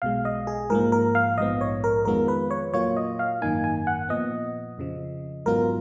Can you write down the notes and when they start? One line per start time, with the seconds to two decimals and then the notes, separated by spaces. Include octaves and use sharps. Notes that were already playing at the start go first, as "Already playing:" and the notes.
0.02 B1 B2 G#3 F5
0.25 D#5
0.47 G#4
0.70 G#2 F3 A#3 A#4
0.92 A#4
1.15 F5
1.37 A#1 G#2 F3 B3 D#5
1.61 C#5
1.84 A#4
2.05 F2 D#3 G#3 B3 F4 A#4
2.28 B4
2.51 C#5
2.73 A#2 F#3 A#3 F4 C#5
2.97 D#5
3.19 F5
3.42 G#1 F#2 D#3 A#3 D#4 G#5
3.64 G#5
3.87 F#5
4.09 A#2 F3 B3 D#5
4.78 F2 C#3 F3
5.45 G#1 G#2 F#3 B3 F4 A#4